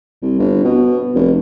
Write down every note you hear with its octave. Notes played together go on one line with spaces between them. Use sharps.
C2
G1
B2
F1